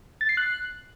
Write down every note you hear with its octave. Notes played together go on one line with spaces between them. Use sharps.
A6
C7
F#6